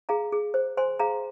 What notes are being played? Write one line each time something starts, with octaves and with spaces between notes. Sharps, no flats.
G#4 F5 A#5
G#4
C5
C5 G#5 C6
G#4 F5 A#5